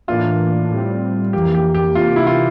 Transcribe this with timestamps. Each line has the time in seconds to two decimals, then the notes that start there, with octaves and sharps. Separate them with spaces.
0.08 A2 E3 A#3 D4 F4
0.71 A2 G3 C4
1.33 F2 E3 A#3 G4
1.55 G4
1.74 G4
1.95 C3 E3 A#3 F4
2.16 E4
2.27 F4